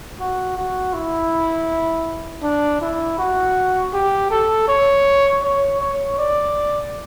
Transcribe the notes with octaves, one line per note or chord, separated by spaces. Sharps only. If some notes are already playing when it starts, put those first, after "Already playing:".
F#4
F#4
E4
D4
E4
F#4
G4
A4
C#5
C#5
C#5
D5